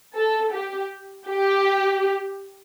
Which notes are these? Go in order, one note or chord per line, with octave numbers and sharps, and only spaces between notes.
A4
G4
G4